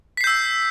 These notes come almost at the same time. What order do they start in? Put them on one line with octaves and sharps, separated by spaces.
B6 C7 G6 E6